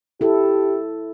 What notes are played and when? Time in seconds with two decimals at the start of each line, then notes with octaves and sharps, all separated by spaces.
0.21 E4 G4 A4